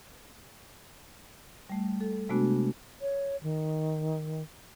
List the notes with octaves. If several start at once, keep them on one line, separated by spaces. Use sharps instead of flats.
G3 A3
A4
C3 G#3 A3 B3 D4 F#4
C#5
D#3